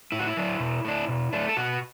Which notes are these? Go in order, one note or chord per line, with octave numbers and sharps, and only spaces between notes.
A2 E4
F#4
E4
F#3 D4
B2
A3 D4
B2
A3 D4
A4
B2 F#4